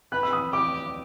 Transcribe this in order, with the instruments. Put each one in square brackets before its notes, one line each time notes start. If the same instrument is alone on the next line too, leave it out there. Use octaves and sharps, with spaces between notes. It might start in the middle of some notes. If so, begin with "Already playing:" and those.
[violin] B4 [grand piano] F#6
[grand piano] E6
D#6
[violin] G4 [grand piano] D6